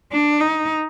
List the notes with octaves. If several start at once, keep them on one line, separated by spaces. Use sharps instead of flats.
D4
D#4